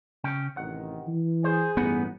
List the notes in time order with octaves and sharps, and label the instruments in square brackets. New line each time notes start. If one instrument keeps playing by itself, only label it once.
[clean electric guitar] C#3 C#4 G5
[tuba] A1 [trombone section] C3 D#3 [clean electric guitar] F#5
[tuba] E3
[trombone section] G#4 [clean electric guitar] C5
[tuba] A1 [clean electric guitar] G2 D#4 F#5 [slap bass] B3